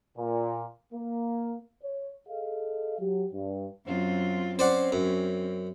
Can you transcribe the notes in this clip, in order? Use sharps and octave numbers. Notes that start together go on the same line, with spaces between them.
A#2
A#3
C#5
G#4 A4 D#5 F5
F#3 G4
G2
F#2 C4 F4
C4 C#4 C5 D5 F#5
F#2